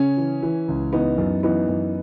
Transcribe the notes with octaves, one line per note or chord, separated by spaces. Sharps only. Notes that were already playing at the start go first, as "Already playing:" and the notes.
Already playing: C#3 C#4
E3
E3
C#2
E3 B3 D#4
F#2
E3 B3 D#4
F#2